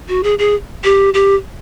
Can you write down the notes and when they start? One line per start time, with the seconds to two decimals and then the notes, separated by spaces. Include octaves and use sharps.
0.09 F#4
0.23 G#4
0.39 G#4
0.84 G4
1.14 G4